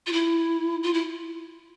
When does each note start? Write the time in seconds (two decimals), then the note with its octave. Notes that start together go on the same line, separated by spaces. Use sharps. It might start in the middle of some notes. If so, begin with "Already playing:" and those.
0.07 F4
0.13 E4
0.83 F4
0.94 E4